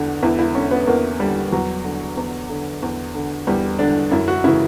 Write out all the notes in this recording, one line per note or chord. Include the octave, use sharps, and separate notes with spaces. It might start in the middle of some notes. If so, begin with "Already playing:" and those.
Already playing: E2 D3
E2 E4
E4
D3 C#4
B3
E2 A#3
D3 G3
E2 F#3
D3
E2
D3
E2
D3
E2 G3
D3 D4
F#2 E4
F#4
C#3 E3 E4